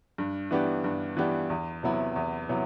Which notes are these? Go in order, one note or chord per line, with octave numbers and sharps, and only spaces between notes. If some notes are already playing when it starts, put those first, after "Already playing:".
G2
E3 B3 D4 G4
G2
E3 B3 D4 G4
E2
C3 F#3 B3 E4
E2
C3 F#3 B3 E4